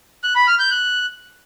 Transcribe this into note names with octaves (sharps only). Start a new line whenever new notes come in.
F#6
B5
F6
G6
F#6